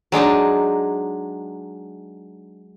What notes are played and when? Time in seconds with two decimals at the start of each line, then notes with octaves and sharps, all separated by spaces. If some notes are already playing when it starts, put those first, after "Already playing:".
0.12 F#3 G#3 D4 D#4